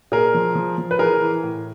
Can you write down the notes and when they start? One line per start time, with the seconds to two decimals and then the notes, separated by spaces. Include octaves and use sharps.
0.12 A#2 G#4 A#4
0.34 F3
0.55 F3
0.78 F3
0.91 B4
0.99 E3 G#4 A#4
1.21 E3
1.44 A2